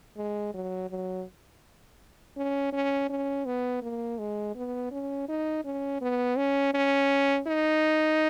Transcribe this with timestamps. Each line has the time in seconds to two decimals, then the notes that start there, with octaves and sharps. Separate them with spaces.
0.17 G#3
0.54 F#3
0.90 F#3
2.36 C#4
2.73 C#4
3.09 C#4
3.46 B3
3.82 A#3
4.18 G#3
4.55 B3
4.91 C#4
5.28 D#4
5.65 C#4
6.01 B3
6.37 C#4
6.74 C#4
7.47 D#4